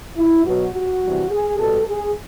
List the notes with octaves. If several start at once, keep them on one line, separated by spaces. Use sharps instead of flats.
E4
B2 F#3 F#4
F#4
C3 E3 G3
G#4
B2 G3 A4
G#4